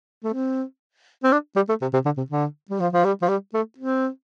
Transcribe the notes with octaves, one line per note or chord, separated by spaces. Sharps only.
A3
C4
C4
D4
G3
A3
C3
C3
D3
C3
D3
G3
F3
F3
G3
F3
G3
A3
C4